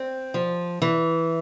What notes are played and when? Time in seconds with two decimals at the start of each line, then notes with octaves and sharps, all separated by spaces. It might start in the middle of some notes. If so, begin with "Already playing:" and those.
Already playing: C4
0.34 F3
0.82 E3